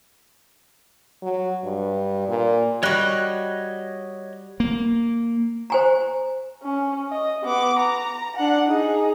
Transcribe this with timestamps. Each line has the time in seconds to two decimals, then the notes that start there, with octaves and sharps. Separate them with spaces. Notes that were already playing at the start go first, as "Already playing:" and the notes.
1.23 F#3
1.64 G2
2.28 A#2
2.83 G3 F#4 C#5 D#5 F#6
4.60 A#3
5.70 C5 G#5 A#5
6.62 C#4
7.11 D#5
7.44 B3 D6
7.79 A#5
8.36 D4 F#5
8.68 D#4 G#4